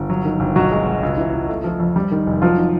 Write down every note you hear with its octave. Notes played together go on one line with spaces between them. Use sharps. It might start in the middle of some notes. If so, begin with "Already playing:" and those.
Already playing: G1
F#3
D#3
G1
B1 F#3 F#4
G#3
B1
C#2
E3
C#2
A3
F3
F2
G3
D#3
F1
F3 F#3 F4
D#3